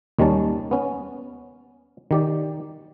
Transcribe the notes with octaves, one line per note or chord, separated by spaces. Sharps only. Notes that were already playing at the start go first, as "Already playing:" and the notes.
D#2 D#3 G3 C#4 A5
B3 C#4
D#3 G4 D5